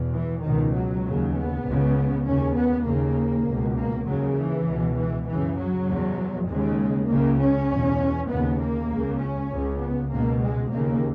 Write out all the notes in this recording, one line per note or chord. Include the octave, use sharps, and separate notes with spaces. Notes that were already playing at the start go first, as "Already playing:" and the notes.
Already playing: E2 B2
E3
C#2 B2 D#3
F#3
D#2 C#3
B3
C#2 C#3
D#2 C#3 C#4
B3
D#2 C#3 A#3
C#2 B2
A#3
D#2 C#3 F#3
E3
C#2 B2
E3
F#2 C#3 E3
F#3
E2 B2
D#2 C#3 G#3
C#2 C#3 A#3
C#4
E2 B2
D#2 C#3 B3
A#3
C#2 C#3
C#4
C#2 C#3
B3
C#2 B2 A#3
G#3
D#2 C#3 A#3